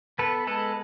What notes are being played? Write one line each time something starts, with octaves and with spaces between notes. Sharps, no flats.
B3 A4 B4
G#3 A4 B4